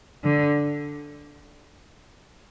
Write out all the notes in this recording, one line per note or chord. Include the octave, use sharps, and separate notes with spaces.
D3